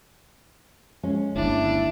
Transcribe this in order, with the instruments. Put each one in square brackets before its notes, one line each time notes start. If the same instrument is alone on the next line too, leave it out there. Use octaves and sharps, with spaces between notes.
[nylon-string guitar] G#3 C#4
[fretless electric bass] G1 D#2 [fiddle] D4 [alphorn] E4